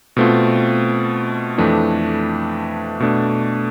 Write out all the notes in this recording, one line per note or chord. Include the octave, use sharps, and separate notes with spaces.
B2 A3 C4 F4
F2 E3 A3 D4
B2 A3 D4